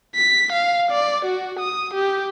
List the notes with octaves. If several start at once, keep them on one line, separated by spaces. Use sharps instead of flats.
B6
F5
D5
F#4
D#6
G4